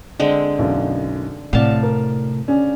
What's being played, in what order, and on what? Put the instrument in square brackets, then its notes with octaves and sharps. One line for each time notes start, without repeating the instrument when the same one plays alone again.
[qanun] D3 G#3 C4
[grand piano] B1 F#2
[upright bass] A2 C3 [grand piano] D5 F#5 [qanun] F5 A5
[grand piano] A#4
C#3 C#4 D4